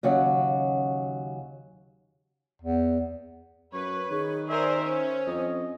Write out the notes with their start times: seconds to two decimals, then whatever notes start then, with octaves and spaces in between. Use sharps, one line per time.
0.03 D#2 C#3 F#3 F#4 F#5
2.62 E2
3.73 F#2 B4 C#5
4.11 D#3 G#4 C#5
4.49 G#4 A#4 C5 D5 E5
4.79 C#4 C5
5.27 F2 D#5